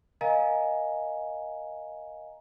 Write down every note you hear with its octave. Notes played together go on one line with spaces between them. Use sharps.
A#4 D#5 F5 G#5 A#5